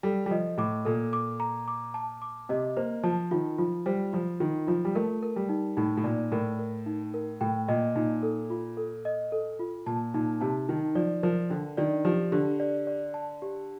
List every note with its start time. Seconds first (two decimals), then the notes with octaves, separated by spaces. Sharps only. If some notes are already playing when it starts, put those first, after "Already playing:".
0.03 G3 A4
0.26 G3
0.31 F3 D#5
0.58 A2 D6
0.85 A#2 A4
1.13 D6
1.40 A#5
1.68 D6
1.94 A5
2.22 D6
2.49 C3 D#5
2.77 A#3 C5
3.03 F3 A5
3.31 D#3 F4
3.58 F3 F4
3.86 G3 C5
4.13 F3 F4
4.40 D#3 F4
4.67 F3 F4
4.85 G3
4.95 A3 A#4
5.23 A#4
5.36 G3
5.49 D#4
5.77 A2 D#4
5.97 A2
6.04 A#2 D5
6.32 A2 A#4
6.59 A#4
6.86 D#4
7.14 A#4
7.41 A2 G5
7.68 A#2 D#5
7.96 A#2 D#4
8.23 A4
8.50 F4
8.77 A4
9.05 D#5
9.32 A4
9.59 F4
9.86 A#2 A5
10.14 A#2 D#4
10.41 C3 A5
10.68 D#3 D#4
10.95 F3 D5
11.23 F3 A#4
11.50 D3 D4
11.77 D#3 D5
12.05 F3 G4
12.32 D3 G4
12.60 D5
12.87 D5
13.14 A5
13.42 G4